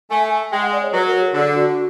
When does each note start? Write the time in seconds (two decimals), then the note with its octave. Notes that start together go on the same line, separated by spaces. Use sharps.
0.11 A3 G#5
0.52 G#3 G5
0.62 F#5
0.72 D5
0.83 C#5
0.93 F#3 B4
1.07 A#4
1.21 G#4
1.34 D3
1.55 F#4